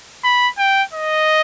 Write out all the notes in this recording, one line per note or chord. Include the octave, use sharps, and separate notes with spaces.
B5
G5
D#5